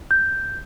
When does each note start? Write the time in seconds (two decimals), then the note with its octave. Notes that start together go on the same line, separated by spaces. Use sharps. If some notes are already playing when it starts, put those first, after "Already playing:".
0.11 G6